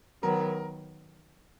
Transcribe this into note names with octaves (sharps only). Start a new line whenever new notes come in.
D#3 F#3 B3 A#4